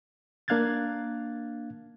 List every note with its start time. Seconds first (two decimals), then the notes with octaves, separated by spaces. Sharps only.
0.48 A#3 D4 F5 F#6 G#6 A6